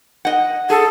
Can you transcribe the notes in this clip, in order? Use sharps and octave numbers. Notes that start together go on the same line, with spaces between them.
D#5 F#5
G#4 A4